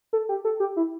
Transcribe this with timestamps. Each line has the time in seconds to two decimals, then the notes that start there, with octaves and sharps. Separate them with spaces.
0.13 A4
0.29 G4
0.45 A4
0.60 G4
0.77 E4